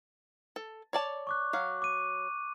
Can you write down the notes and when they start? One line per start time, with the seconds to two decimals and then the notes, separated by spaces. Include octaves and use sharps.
0.56 A4
0.93 C#5 D5 A5
1.27 C#6 D6 F#6
1.53 F#3 F5
1.82 D6 D#7